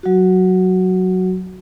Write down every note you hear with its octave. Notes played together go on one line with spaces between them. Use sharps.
F#3 F#4